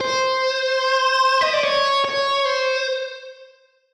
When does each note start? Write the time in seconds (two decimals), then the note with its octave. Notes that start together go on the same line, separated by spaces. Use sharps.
0.01 C5
1.41 D#5
1.53 D5
1.64 C#5
2.05 C#5
2.45 C5